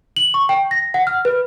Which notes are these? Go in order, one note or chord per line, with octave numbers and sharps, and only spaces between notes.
F#7
C#6
G5
A#6
F#5
F6
B4